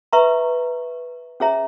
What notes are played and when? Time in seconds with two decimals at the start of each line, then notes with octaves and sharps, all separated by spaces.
0.13 B4 E5 A#5 C#6
1.40 C#4 G#4 C#5 E5 A#5